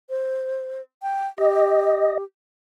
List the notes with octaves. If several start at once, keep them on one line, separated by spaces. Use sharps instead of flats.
C5
G5
G4 D#5